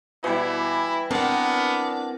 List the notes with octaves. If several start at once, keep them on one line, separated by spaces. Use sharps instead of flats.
B2 E3 G3 E4
B3 C4 D4 A#4 F#5